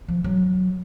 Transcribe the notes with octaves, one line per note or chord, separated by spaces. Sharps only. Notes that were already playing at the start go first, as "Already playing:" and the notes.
F3
F#3